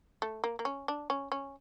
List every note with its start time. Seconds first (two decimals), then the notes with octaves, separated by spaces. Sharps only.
0.22 A3
0.44 A#3
0.59 A#3
0.65 C#4
0.88 D4
1.10 C#4
1.32 C#4